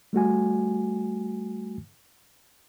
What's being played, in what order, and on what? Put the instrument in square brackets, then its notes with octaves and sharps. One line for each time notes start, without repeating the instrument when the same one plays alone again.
[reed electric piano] G3 A3 F#4 G#5